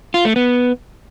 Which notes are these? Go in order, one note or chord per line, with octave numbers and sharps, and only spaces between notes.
F4
A3
B3